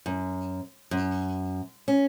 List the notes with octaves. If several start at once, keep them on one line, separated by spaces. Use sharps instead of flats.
F#2
F#2
C#4